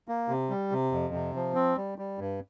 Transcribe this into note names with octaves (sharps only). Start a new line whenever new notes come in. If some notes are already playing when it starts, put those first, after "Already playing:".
A#3
C3
G3
C3
F2
C3
F3
C4
G3
G3
G2